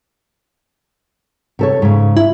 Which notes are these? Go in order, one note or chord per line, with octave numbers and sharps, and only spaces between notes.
C3 A4 C#5
G#2 C#3
E4